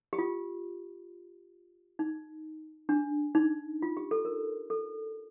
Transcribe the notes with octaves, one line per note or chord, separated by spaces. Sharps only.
G4
F4
D#4
D4
D#4
F4
G4
A4
A#4
A4